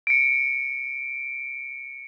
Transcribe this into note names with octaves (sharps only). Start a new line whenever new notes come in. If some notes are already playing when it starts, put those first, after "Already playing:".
C#7 D7